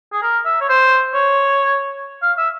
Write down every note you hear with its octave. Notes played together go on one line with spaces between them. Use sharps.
G#4
A#4
E5
C#5
C5
C#5
F5
E5